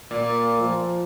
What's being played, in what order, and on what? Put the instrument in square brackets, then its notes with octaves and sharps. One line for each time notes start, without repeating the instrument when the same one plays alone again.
[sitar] A#2
[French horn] A#3
F3